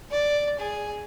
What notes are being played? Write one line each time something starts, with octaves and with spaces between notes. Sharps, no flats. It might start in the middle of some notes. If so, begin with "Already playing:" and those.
D5
G#4